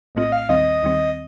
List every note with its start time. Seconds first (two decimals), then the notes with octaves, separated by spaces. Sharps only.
0.15 A#1 A2 A3 C4 F4 D#5
0.32 F5
0.49 D#2 D#3 G3 C4 D#5
0.83 D#2 D#3 G3 C4